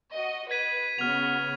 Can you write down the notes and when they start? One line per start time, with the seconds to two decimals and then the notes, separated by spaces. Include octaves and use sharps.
0.14 F#4 D#5
0.51 B4 G#6 B6 D#7
0.98 C#3 B3 F#4 F6 F7